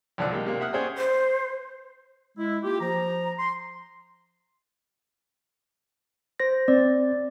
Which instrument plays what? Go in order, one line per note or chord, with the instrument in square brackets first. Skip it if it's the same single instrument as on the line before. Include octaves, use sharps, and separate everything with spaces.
[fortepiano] B1 D3 F3 D4 F#6
G#3 A#3 G4
C3 A#3
E5 F#5 D#6 F6 F#6
C#4 G#4 C5 D5 G5
[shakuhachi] C5
[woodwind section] G#3 E4
A#3 F4 G4
F3 A#5
C6
[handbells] C5 A#6
[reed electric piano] C4 [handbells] D5